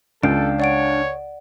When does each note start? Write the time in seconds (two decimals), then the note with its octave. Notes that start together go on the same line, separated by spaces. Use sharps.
0.23 C#2 D4 A4 F5 G5 D7
0.60 C#5 D5 F#5 D7